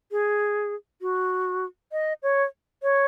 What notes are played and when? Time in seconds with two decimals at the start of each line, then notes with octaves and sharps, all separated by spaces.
0.12 G#4
1.01 F#4
1.92 D#5
2.23 C#5
2.83 C#5